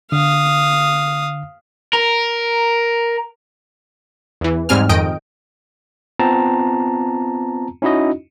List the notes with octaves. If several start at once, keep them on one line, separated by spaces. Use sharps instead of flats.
D3 F5 D#6
A#4
E2 E3
G#2 G3 C4 G#5 F6
F2 D#3 D#5 G5 D7
B3 C4 F4 A5 A#5
C#4 D#4 E4 F#4 D#5